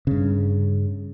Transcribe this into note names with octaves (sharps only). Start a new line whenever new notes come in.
G2 C#3